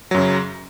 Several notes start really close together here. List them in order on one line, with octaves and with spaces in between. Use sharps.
F#3 F#2 C#3